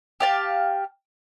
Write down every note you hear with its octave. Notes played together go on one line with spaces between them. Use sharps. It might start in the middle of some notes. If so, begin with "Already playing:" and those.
G4 F5 A5